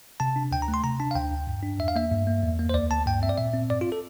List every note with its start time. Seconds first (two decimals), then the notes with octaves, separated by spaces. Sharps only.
0.20 C3 A5
0.36 D4
0.51 D2 G5
0.62 A#5
0.68 A3
0.74 C6
0.84 C3 A#5
1.00 D4 A5
1.11 F5
1.15 D2 G5
1.32 D2
1.47 G2
1.63 D4
1.79 E2 E5
1.88 F5
1.96 A#3 E5
2.11 G2
2.27 A#3
2.43 E2
2.59 A#3
2.69 C5
2.74 D2 D5
2.91 D2 A5
3.06 G2 G5
3.22 C4 E5
3.29 D5
3.38 A#2 E5
3.54 C4
3.70 G2 D5
3.81 F4
3.92 A4